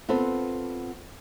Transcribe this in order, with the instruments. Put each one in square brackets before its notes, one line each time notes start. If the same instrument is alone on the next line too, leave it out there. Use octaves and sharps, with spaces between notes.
[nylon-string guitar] B3 C4 F4 A4 C5